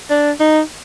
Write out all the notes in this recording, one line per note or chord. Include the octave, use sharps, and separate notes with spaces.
D4
D#4